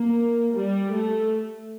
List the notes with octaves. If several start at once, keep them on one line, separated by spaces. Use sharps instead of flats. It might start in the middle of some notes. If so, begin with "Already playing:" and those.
Already playing: A#3
G3
A3